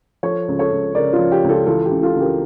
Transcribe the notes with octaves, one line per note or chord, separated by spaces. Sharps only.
F3 A4 C#5
C#2
A4 C#5
C#2
C#3 A#4 D5
F4
F3
G4
C#2
F4 A4
E3 F4 A4
G4
C#2
F4 A4
C#2
G4 A#4